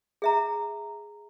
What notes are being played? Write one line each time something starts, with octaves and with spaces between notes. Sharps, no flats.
G#4 E5 A#5